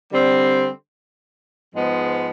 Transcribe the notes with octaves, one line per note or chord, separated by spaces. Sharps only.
D3 G3 C4
G#2 F3 G#3 B3